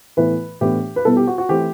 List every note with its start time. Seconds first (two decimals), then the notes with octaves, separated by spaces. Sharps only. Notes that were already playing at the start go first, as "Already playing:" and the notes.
0.17 A2 E3 B3 E4 B4
0.61 A2 E3 B3 D4 G4
0.96 B4
1.05 B2 G3 B3 E4 A4
1.17 G4
1.27 F#4
1.38 F#4
1.49 E3 A3 C4 E4 G4